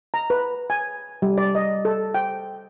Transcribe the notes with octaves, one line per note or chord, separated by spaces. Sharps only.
A#5
B4
G#5
G3
D5
D#5
A4
G5